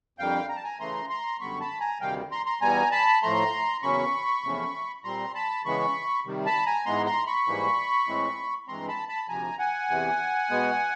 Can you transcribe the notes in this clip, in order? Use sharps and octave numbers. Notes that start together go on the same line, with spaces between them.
F2 D3 G3 A#3 F5 G5
A#5
A5
G#5 A#5
C#3 E3 A3 A#5 C6
A#5 C6
F#2 D3 G3 B3 B5 C#6
A5 B5
G#5 A#5
D2 C3 D#3 G3 F5 G5
A#5 C6
A#5 C6
E2 B2 G3 B3 G#5 A#5
A5 B5
A2 F3 A3 A#5 C6
E2 C#3 F#3 A#3 C#4 B5 C#6
E2 C3 F3 A3 C#4
A#2 G3 C4 A#5 C6
A5 B5
C#3 E3 G#3 B3 B5 C#6
C3 D#3 G3
A5 B5
G#5 A#5
G#2 E3 G#3 B3 A#5 C6
A#5 C6
B5 C#6
G#2 E3 G3 A#3
A2 E3 G#3 C4
G2 E3 G#3 C4 A#5 C6
A5 B5
A5 B5
D2 C3 F3 G#5 A#5
F#5 G#5
E2 C3 E3
B2 G#3 B3